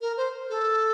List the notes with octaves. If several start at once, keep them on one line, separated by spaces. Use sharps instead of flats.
A#4
C5
A4